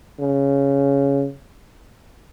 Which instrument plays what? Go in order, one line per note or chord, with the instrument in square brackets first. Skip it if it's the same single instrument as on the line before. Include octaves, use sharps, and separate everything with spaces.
[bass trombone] C#3